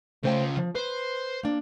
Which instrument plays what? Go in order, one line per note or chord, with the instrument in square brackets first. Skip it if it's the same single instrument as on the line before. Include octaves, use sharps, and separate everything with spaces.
[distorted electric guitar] C#3 F4 [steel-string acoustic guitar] A3 C5 G5
[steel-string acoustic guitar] F3
[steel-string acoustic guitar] B4 [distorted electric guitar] C5
[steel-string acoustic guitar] A#3 D4